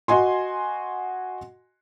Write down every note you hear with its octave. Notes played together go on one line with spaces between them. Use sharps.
F#4 D#5 G#5 C6